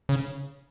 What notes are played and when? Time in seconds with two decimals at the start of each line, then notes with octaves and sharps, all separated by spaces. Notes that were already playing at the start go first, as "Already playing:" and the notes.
0.09 C#3